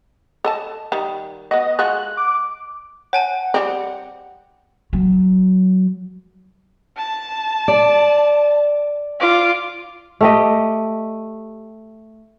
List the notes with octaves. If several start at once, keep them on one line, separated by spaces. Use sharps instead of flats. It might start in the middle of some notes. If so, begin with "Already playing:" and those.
A4 D#5 A5
D#3 G3
B3 F#4 D#5
G#3 F4 F#4 F#6
D6
C#5 F#5 G#5 A5
G3 C4
F#3
A5
D5
F4 D6
A3 G4 D#5